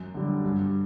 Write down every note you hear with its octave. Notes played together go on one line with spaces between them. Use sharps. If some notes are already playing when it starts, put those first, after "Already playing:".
Already playing: F#2
D3 G3
G2